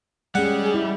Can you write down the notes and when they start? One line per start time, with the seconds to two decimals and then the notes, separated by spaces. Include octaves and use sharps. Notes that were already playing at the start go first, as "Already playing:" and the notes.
0.35 G3 G#3 C#4 G#4 F#5
0.74 E4